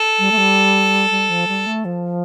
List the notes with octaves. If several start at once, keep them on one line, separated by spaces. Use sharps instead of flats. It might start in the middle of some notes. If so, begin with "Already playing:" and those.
Already playing: A4
G3
A3
G3
G3
F3
G3
A3
F3